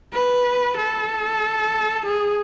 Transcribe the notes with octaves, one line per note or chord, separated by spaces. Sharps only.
B4
A4
G#4